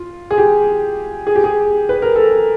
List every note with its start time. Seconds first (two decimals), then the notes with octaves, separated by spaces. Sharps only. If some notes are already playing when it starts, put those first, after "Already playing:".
Already playing: F4
0.31 G#4
0.38 G4
1.27 G#4
1.36 G4
1.44 G#4
1.89 B4
2.02 A#4
2.16 A4